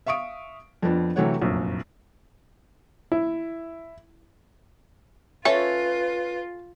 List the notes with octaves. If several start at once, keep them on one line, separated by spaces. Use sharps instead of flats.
E5 F5 C#6 D#6 D7
F2 F3 B3 D4
C3 E3 F#3 A3 C#5 F#5
F1 A#1 F#2
E4
C#4 F4 A4 B4 C#5 E5